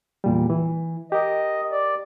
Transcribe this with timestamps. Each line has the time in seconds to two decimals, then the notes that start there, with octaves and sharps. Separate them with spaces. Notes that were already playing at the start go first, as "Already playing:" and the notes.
0.24 E2 A#2 G3
0.50 E3
1.12 G4 A#4 D#5
1.72 D5